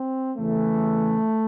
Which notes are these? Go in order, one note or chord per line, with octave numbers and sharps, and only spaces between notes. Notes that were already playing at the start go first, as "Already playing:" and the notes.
Already playing: C4
E2 C#3 E3 A3